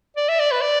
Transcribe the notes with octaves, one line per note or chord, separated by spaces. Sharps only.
D5
E5
D5
B4
D5